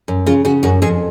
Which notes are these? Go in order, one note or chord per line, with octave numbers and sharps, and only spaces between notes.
F#2
C#3 F4
C#3 F#4
F#2 F#4
F2 G#4